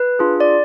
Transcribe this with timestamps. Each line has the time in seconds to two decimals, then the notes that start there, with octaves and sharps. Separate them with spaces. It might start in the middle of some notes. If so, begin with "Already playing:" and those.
Already playing: B4
0.19 D4 F4 G#4
0.40 D5